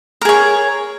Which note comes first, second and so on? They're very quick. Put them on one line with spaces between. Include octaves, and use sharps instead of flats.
A#4 G#4 C#5